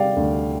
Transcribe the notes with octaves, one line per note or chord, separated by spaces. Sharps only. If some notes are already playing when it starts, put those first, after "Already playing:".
Already playing: C3 G3 D5 F5 G5
D2